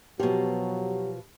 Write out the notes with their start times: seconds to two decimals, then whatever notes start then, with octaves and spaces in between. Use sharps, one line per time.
0.20 B2 F3 F#3 G4